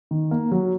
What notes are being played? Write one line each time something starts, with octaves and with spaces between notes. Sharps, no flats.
D#3
A#3
F#3